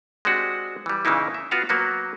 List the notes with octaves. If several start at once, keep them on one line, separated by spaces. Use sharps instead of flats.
G#3 C4 D4 F#4 G4
E3 G3
A#2 C#3 E3 A#3 D#4 E4
E5
B3 F4 F#4 F5
F#3 A#3 B3 F#4